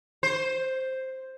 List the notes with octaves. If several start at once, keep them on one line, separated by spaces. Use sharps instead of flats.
C5